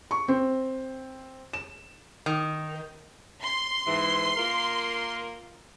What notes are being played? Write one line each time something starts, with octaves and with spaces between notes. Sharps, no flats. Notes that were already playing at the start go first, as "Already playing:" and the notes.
C#6
C4
E7
D#3
C6
G#2 E3
A#3 F4 A#4